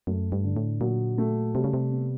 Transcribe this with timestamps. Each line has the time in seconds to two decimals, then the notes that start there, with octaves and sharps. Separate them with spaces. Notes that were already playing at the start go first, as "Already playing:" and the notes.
0.07 F#2 A3
0.32 G2
0.44 D3
0.57 A2
0.81 A#2 F#3
1.18 A3
1.55 C3 G3
1.64 C#3
1.74 C3
1.92 B3